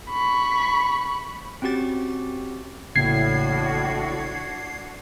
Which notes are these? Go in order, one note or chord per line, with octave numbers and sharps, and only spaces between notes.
B5 C#6
C4 C#4 F#4 G4 A6
A1 A2 C#3 A#3 D4 F#4 G#6 C7